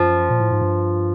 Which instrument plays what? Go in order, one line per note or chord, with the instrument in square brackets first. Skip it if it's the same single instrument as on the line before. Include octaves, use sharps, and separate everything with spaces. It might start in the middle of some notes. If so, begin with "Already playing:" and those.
Already playing: [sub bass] F#2 [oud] F3
[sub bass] A#2
A2
G#2
G2